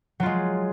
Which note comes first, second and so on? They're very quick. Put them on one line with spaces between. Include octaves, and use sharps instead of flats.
F#3 F4 G#3